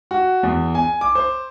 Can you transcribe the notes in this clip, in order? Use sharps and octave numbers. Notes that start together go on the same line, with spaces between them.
F#4
E2
G#5
D6
C5